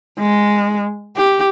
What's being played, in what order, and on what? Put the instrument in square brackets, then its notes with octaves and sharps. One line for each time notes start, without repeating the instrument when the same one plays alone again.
[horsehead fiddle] G#3
G4